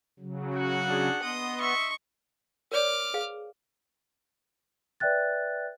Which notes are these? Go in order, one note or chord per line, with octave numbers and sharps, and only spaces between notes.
C#3 F#3
F#4 F#5
D4 G#4
B3 D#5 C6 D#6
E5 C#6
A#4 C#5 D5 D6 F6
G#4 B4 F5
B4 D5 E5 G5 F#6 A6